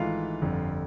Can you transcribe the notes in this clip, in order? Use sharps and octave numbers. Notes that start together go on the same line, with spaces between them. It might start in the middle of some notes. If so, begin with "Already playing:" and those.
Already playing: G#1 G#2 E3 A3 F4 F5
G1 F2 D3